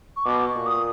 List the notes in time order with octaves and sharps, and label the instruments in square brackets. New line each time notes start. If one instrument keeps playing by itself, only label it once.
[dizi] C#6
[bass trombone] B2 [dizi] D6
[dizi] C#6
[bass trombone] A#2
[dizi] D#6